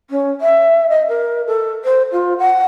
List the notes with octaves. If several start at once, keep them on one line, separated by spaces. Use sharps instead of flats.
C#4
E5
D#5
A#4
A4
C5
F4
F#5